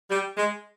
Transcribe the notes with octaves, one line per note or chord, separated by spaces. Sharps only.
G3
G#3